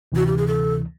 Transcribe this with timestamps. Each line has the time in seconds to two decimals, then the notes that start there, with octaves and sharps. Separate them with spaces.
0.12 D2 C3 E3 F#4
0.27 G4
0.37 G#4
0.47 A4